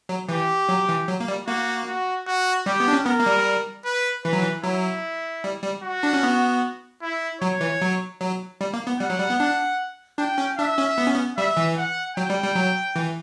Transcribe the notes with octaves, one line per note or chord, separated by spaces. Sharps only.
F#3
E3 G4
F#3
E3
F#3
A#3
G3
A#3 F#4
F#4
F#4
G3 G4
B3
D4
C#4
B3 A#4
A#3
G3
B4
E3 B4
F#3
E3
F#3 E4
G3
G3
F#4
D4
C#4
B3
E4
F#3 C#5
E3
F#3
F#3
G3
A#3
B3
G3 F#5
F#3
G3
B3
D4
D4 G5
C#4
D4 E5
C#4
B3
C#4
B3
G3 E5
E3
F#5
F#3 G5
G3
G3
F#3
E3